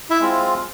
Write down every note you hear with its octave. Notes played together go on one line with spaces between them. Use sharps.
E4 E5
G#3 C4 F4